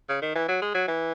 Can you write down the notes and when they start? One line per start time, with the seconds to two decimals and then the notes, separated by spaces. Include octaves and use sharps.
0.09 C#3
0.22 D#3
0.35 E3
0.48 F#3
0.62 G#3
0.75 F#3
0.88 E3